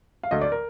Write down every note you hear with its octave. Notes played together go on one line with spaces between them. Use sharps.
F5
D2 D#5
D5
A#4